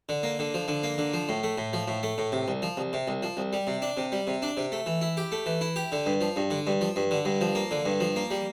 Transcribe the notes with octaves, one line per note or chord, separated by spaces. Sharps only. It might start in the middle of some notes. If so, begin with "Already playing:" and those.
D3
A#3
D3
F3
D3
A#3
D3
F3
A2
A3
A2
F3
A2
A3
A2
C3
C2
F3
C2
C3
C2
F3
C2
G3
C3
D4
C3
G3
C3
D4
C3
A3
E3
E4
G4
A3
E3
E4
G4
D3
G2
F3
G2
D3
G2
F3
G2
D3
G2
F3
A#3
D3
G2
F3
A#3
G3